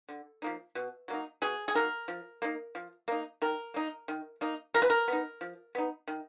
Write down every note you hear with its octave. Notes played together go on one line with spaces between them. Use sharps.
D3
F3 A#3 D#4
B2
F#3 A#3 D#4
B2 G#4
G#4
F#3 A#3 D#4 A#4
F3
A#3 D#4
F3
A#3 D#4
D#3 A#4
A#3 D#4
D#3
A#3 D#4
F3 A#4
B4
A#4
B3 D#4
F3
B3 D#4
D#3